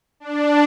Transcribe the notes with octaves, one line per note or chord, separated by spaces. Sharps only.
D4